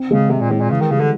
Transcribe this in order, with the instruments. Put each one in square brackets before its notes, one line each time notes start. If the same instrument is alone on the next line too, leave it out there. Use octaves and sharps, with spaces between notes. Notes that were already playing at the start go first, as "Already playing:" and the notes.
Already playing: [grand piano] C4
[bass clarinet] C#3 [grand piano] G#3
[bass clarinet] C3 [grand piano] G#3
[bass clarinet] A#2
[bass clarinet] A2 [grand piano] G#3
[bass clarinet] A#2
[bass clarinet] C#3 [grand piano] E3
[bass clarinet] D#3
[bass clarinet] C#3 [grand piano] G3
[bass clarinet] D3